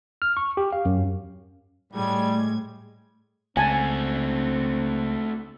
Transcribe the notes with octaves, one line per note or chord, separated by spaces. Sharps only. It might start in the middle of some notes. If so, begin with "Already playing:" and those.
F6
C#6
G4
F5
F#2
A2 G3 G#3 G#6
C#2 A3 C4 F#4 G#5 A5